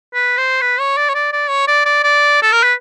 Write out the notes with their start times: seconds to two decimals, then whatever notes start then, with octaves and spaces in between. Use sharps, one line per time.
0.14 B4
0.38 C5
0.61 B4
0.79 C#5
0.97 D5
1.09 C#5
1.14 D5
1.33 D5
1.50 C#5
1.67 D5
1.86 D5
2.03 D5
2.42 A4
2.52 A#4
2.63 B4